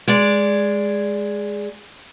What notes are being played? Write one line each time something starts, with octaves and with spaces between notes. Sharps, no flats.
G#3 D5